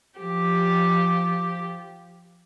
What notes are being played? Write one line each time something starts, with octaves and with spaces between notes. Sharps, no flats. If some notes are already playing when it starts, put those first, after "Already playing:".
F3 G4